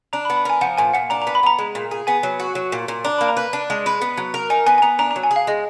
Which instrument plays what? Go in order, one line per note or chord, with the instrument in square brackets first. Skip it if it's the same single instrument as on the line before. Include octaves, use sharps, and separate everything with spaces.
[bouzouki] D4 [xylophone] A#5
[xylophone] B5
[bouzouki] B3
[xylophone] B5
[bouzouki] A#4 [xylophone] G#5
[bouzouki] F3 [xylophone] F#5
[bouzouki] A#2 [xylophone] G#5
[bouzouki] A#2 [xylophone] F#5
[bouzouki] D4 [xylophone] A#5
[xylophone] A#5
[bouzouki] B3
[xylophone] B5
[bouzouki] B3 [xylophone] A#5
[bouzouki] G#3
A#2
G#4
[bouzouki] B3 [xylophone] G#5
[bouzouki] F#3
F#4
F#3
A#2
A#2
[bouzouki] D4 [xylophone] A#5
[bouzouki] A#3 [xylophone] B5
[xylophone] A#5
[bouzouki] B4
D4
G#3
B4
B3
F#3
A#4
[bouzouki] D#4 [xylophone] G#5
[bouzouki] B3 [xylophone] G#5
[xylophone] G#5
[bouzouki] B3 [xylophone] A#5
[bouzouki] D4 [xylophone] A#5
[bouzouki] F#3 [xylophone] A#5
[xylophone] G#5
[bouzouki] G#4
[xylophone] F5
[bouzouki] G#3 [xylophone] D#5